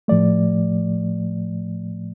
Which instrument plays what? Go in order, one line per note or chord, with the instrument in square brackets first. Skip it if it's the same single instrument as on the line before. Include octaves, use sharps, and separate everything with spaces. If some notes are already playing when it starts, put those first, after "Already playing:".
[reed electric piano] A2 F3 A3 D5